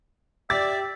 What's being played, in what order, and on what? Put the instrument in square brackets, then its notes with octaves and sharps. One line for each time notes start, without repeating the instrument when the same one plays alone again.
[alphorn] G4 [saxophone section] D5 [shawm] E5 [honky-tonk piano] A6